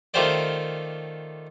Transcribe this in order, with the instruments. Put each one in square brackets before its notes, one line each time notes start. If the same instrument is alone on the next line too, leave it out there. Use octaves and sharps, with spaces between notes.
[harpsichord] D#3 A3 F4 G4 C5 D5